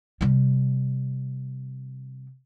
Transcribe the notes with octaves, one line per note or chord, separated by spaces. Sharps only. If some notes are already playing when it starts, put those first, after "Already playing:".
C3 G3